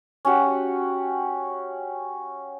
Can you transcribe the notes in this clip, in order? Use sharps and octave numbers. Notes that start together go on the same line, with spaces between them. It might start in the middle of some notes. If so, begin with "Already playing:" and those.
C#4 F#4 G4 F#5